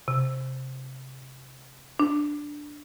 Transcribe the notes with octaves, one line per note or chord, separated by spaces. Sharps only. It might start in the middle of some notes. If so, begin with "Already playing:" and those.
C3
D4